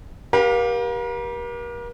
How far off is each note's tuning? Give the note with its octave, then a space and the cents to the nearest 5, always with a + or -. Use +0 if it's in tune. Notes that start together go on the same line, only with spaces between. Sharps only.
G4 +0 A#4 +40 F5 +30